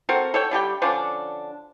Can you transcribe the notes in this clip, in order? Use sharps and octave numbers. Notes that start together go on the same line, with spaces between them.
C4 F#4 A4 A#4
A4 C#5 G5
D3 G3 G4 G5
D3 F3 C#4 D4